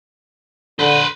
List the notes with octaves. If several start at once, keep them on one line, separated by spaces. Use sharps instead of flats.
D3 B4 C5